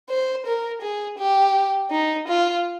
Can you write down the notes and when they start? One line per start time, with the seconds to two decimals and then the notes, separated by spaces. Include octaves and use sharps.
0.10 C5
0.46 A#4
0.82 G#4
1.18 G4
1.91 D#4
2.28 F4